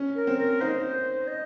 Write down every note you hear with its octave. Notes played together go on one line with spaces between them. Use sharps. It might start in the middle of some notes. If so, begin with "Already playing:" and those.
Already playing: C#4
A#4
C4
A#4
D#4 C5
D#5